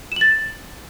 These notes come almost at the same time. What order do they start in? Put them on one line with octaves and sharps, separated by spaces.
E7 F#7 A6